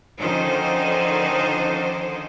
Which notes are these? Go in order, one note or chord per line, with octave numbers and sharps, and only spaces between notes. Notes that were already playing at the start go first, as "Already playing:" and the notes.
D3 D#3 F3 C#4 D#4 C5